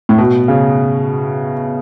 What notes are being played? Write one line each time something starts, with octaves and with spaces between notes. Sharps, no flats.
A2
B2
C#3